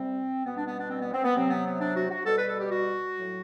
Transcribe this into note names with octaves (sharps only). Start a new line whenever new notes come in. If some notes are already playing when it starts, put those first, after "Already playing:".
Already playing: C3 G3 C4
B2 G3 B3
D4
B3
D4
C4
B3
C4
B3
C3 F#3 C4
B3
B3
D4
F#4
F#4
B2 G3 A4
B4
A4
G4
F#4
A2 F#3